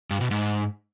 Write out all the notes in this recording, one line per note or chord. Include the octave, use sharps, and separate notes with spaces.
G2
B2
G#2